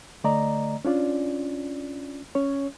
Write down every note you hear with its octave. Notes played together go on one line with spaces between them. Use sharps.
D3 A3 D5 D#5 A#5
C#4 D4 F4 D5
C#4 C#5